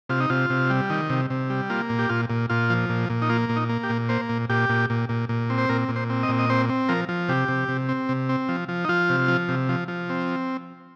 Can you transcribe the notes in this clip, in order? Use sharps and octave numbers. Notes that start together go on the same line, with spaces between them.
C3 F4
D#4
C3 F4
C3
G3
D#3
C3
C3
G3
A#3 F4
A#2
G4
A#2 F4
A#2
A#2 F4
F3
A#2
A#2
D#4
A#3 F4
A#2
D#4
A#3
G4
A#2
A#3 C5
A#2
A#2 G4
A#2
A#2
A#2
A#2
C4
C5
A#2 A#4
A#2
C5
C4
D#5
A#2
D#5
C4 C5
C4
F3 A#4
F3
C3 G4
C3
C3
C4
C3
C4
F3
F3
D#4
F3 F4
C3
F3
C3
F3
F3
C4